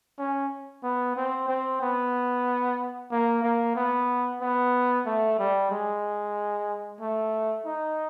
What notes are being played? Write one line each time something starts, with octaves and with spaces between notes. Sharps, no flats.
C#4
B3
C4
C4
B3
A#3
A#3
B3
B3
A3
G3
G#3
A3
D#4